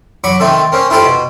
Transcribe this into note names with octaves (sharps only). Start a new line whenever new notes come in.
F#3 B5 C#6 D6
D#3 A3 C4 A4
A#3 C4 C#4
E4 F4 G4 A4 C5
B2